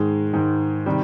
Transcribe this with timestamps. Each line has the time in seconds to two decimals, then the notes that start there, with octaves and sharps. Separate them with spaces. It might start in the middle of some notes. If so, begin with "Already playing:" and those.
Already playing: G#2 D#3 G#3
0.33 G#2 D#3
0.86 C3 D#3 G3